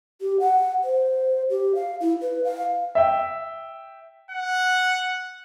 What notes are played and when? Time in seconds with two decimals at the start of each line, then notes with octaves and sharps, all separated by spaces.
0.21 G4
0.40 F#5
0.84 C5
1.50 G4
1.75 F5
2.00 E4
2.21 B4
2.44 F5
2.95 E5 G5
4.31 F#5